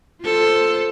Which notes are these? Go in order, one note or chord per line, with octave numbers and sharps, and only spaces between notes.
F4 A4 C5